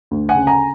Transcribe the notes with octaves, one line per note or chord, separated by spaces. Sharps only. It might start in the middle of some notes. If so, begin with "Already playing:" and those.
D2
F#5 G#5
C#3
G#5 A#5